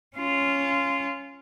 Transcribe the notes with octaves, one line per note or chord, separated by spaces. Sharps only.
C#4 F4